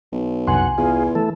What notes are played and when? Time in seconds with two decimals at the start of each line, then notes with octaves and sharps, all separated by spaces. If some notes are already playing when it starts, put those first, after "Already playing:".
0.12 B1
0.47 C2 F#2 F#5 G#5 C6
0.78 E2 F4 G#4
1.15 E3 A3 A4